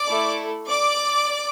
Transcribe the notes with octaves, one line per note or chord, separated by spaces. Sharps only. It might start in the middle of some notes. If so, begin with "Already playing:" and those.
Already playing: D5 D6
A3 E4 A4
D5 D6